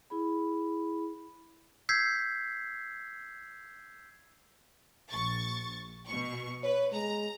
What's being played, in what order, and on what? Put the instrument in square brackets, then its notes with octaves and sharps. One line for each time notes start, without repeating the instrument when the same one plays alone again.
[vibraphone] E4 G#4 B5
[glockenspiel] E6 G6 G#6 B6 C7
[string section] A#1 C#6 A6
B2 C#6
[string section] B4 [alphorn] C#5
[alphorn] G#3 [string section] A#5